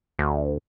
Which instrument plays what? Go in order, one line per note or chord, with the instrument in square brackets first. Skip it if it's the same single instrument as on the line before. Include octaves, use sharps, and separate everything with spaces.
[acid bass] D2